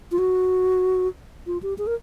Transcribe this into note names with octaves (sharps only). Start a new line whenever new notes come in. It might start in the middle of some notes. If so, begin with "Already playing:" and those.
F4
F#4
F4
G4
G#4
A#4